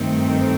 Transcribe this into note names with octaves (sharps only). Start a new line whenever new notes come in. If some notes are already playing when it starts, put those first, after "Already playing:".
Already playing: G2 D#3 A3 C4